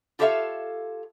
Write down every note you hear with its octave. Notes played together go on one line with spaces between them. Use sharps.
F4 G4 A4 C#5 E5 F5